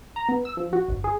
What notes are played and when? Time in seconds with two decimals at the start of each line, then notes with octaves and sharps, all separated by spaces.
0.16 A#5
0.29 B3
0.45 E6
0.57 F3
0.73 F#4
0.88 G1
1.04 G#4